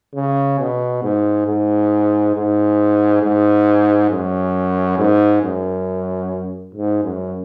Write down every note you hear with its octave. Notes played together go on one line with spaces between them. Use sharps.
C#3
B2
G#2
G#2
G#2
G#2
F#2
G#2
F#2
G#2
F#2